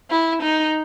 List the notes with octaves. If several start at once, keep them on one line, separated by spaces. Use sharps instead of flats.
E4
D#4